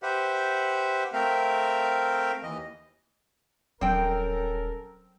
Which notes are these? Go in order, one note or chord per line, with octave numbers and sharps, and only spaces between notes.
G4 B4 C5 E5 F#5
A3 C4 A#4 E5 F5 G5
D#2 E3 D#5
D#1 F#3 C4 C#4 A4 A#4 G5